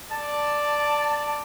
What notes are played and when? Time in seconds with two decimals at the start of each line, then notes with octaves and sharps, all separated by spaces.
0.11 D5 A5